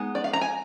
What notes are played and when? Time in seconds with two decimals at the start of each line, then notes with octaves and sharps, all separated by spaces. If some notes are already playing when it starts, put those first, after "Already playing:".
Already playing: G#3 B3 D#4
0.15 D5
0.24 F5
0.33 A#5
0.41 G#5